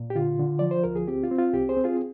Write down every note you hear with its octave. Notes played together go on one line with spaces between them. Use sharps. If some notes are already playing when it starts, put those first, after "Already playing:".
Already playing: A#2
G4
D3 F4
D3
F3 D5
C5
D2 A#4
G#4
C4 G4
F4
C4
F4
C2 G4
G#4 C5
C4
F4 G#4